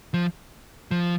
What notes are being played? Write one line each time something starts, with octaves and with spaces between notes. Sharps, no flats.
F3
F3